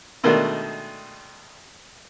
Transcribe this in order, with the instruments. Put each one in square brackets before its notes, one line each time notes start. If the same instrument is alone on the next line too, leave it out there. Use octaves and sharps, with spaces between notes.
[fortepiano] B2 D#3 G#3 A3 D4